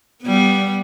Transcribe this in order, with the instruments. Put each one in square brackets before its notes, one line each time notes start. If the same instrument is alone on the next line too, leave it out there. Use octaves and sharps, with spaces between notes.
[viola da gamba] G3 B3